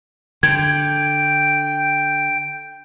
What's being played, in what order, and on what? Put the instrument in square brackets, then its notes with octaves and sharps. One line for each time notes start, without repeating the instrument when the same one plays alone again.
[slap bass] D3 [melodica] G5 [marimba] G#6